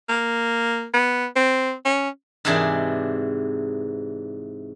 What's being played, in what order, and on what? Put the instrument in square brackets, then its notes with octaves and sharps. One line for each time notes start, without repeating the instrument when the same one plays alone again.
[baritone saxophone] A#3
B3
C4
C#4
[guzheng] G#2 C3 E3 D4 G#4 D5